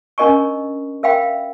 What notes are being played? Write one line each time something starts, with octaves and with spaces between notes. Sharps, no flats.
C#4 D4 A#4 D#5 A#5 C#6
A#4 E5 F5 G5 B5